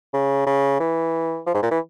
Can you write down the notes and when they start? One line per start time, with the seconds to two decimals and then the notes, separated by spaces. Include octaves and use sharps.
0.13 C#3
0.47 C#3
0.80 E3
1.47 F3
1.54 G#2
1.63 A#2
1.71 E3